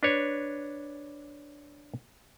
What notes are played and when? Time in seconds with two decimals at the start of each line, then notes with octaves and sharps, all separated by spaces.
0.03 D4 B4 C#5